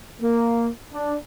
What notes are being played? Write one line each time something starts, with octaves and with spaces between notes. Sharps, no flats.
A#3
D4